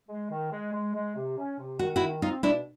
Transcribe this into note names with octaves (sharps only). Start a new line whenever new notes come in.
G#3
D#3
G#3
G#3
G#3
C3
C#4
C3
D#3 F#4
E4 F#4
D#3
C4 D#4 F4
B2 D4 E4